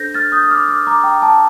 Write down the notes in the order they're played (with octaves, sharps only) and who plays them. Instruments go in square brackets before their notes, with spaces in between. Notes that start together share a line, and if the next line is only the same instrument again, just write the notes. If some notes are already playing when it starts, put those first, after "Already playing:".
Already playing: [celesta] D4 A4 C5 G6 A#6
F6 A6
D#6 G6
D#6
D6 F6
D6 F6
A#5 D6
G5 A#5
A5